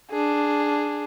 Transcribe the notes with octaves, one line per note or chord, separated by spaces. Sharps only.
D4 G#4